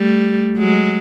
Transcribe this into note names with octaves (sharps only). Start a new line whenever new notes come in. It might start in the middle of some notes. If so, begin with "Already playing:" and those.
Already playing: G3 A3
F#3 G#3